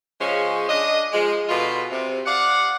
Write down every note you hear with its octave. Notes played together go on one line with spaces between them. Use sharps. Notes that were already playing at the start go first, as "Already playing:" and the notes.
C#3 F3 G#3 C#4
D4 D#5
F3 G#3
B2 D3 F4
C3
D5 F5 F#5